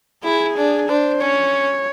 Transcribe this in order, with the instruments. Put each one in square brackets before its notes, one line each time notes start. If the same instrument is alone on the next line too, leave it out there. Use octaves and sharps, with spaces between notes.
[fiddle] E4 [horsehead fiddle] G#4
[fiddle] D4
[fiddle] D4 [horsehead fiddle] C5
[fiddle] C#4 [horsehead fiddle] C#5